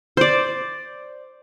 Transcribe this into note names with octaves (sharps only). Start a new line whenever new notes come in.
C5 D5